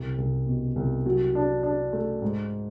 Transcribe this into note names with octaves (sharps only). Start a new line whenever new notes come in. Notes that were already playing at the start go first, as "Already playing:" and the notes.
Already playing: C2
C2
B2
C2
F#3
D4
D4
A3
G#2